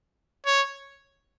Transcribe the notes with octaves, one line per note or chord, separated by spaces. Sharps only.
C#5